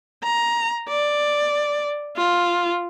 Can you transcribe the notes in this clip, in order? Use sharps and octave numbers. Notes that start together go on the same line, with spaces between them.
A#5
D5
F4